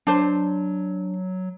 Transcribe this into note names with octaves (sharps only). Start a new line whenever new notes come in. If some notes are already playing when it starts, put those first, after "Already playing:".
F#3 D4 C5